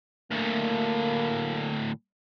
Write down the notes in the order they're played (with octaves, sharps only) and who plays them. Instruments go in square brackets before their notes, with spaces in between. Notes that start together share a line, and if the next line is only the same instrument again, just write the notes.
[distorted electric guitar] D2 A2 [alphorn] A#3